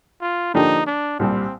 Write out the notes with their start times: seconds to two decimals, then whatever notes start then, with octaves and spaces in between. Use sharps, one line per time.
0.22 F4
0.54 D3 F3 A#3 D4 D#4 G4
0.87 D4
1.19 C2 A#2 G3 C4